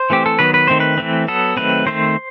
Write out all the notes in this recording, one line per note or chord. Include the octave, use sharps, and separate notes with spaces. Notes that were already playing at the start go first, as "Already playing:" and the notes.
Already playing: C5
E3 A3 C4 G4
A4
D#3 F#3 B3 B4
B4
D#3 A3 C4 C5
B4
E3 A3 C4
F#3 B3 A4
D#3 F#3 A3 C4 B4
D#3 A3 C4 C5